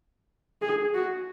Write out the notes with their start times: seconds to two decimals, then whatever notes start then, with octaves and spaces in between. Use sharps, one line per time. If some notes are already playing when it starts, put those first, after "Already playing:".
0.62 G#4
0.94 F#4